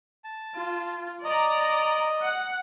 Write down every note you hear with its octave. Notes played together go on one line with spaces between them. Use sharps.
A5
F4
D5 D#5 A#5
F#5